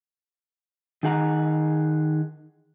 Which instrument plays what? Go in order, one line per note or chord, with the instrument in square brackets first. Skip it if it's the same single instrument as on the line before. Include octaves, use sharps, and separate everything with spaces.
[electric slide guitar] D#3 D#4 G#4 F#5 A#5